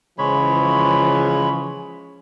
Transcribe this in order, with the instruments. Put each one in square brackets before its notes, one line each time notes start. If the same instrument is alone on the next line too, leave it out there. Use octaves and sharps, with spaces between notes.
[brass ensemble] C#3 E3 F3 [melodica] G#3 C#5 B5